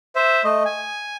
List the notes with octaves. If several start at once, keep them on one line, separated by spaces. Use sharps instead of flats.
C5 E5
A3 D#5
G#5